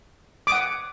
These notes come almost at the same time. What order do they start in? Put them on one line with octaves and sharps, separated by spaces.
D6 D#6 F#5